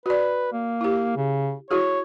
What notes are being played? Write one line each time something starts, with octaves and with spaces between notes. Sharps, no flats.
F#4 B4 D5
A#3
E4 G4
C#3
E4 F#4 G#4 C#5